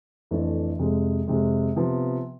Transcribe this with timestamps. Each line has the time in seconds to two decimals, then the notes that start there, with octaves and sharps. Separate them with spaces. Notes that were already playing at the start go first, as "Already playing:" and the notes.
0.31 F2 E3 A3 D4
0.79 F2 C3 G#3
1.28 F2 C3 G#3
1.76 C3 F3 B3